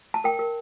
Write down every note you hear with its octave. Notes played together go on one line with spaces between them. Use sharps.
A5
A#4 G5
A#4